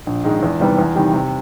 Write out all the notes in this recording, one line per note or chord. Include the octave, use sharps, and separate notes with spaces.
A#1
G#2 D#3 G#3
E2
C3 D#3 G3 B3
E2
C3 D#3 G3
C3